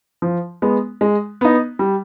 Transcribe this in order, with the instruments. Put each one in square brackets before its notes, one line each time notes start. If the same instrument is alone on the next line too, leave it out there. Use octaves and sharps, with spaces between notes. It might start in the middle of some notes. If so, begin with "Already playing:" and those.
[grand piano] F3
G#3 B3
G#3
B3 D#4
G3